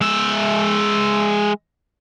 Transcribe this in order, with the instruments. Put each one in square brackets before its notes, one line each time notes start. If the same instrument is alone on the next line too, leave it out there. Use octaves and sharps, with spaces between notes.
[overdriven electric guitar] G#3 E5